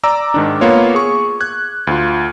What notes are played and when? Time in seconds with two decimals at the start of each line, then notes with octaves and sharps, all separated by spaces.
0.04 D5 A#5 D6 E6
0.34 G#2 D#3 D4
0.61 A#3 B3 F4 C#5
0.95 G#4 C#6
1.40 F#6 G#6
1.87 D2 F4